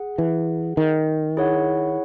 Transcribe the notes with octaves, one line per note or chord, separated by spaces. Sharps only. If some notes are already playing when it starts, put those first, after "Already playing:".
Already playing: G#4 F#5
E3
D#3
E4 G#4 C#5 F#5